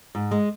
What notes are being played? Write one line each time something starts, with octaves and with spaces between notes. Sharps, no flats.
G#2
G#3